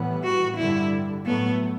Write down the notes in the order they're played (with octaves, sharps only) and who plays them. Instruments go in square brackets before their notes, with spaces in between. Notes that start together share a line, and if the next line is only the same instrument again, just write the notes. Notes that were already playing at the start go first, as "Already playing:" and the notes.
Already playing: [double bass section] A2 E3 G3 B3
[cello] F#4
[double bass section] G2 D3 G3 [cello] E4
[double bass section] A2 F#3 A3 [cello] B3